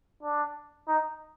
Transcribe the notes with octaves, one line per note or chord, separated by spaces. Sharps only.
D4
D#4